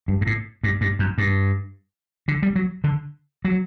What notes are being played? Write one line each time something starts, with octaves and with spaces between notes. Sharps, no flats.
G2
G2
A2
G2
G2
F#2
G2
D3
G3
F#3
D3
F#3